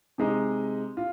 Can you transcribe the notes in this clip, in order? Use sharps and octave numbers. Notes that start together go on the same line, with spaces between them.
C3 G#3 D#4
F4